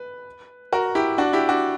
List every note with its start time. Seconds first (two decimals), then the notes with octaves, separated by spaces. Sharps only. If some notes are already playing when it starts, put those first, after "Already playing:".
Already playing: B4
0.73 F#4 A#4
0.95 E4 G4
1.18 D4 F#4
1.33 E4 G4
1.49 D4 F#4